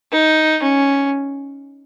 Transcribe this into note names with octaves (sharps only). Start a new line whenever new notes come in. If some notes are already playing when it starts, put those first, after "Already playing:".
D#4
C#4